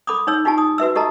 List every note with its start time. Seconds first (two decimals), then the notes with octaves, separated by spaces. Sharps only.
0.07 A4 B5 D6 D#6
0.27 D#4 C#5 E6
0.45 D#4 F4 G4 G#5 A5
0.58 D#6
0.78 F#4 B4 E5 E6
0.95 G4 A4 D#5 A5 A#5